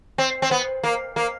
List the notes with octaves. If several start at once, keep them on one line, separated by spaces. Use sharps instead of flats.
C4
C4
B3
A#3
A#3